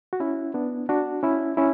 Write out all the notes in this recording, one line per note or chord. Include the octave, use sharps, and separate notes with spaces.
F#4
C#4 E4
B3 D4
D4 F#4
C#4 E4
C#4 E4